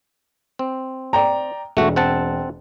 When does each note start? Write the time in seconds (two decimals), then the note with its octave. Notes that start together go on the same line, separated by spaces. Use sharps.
0.59 C4
1.13 D5 G5 A#5
1.77 E1 A3 F#4
1.96 C4 F#5 A5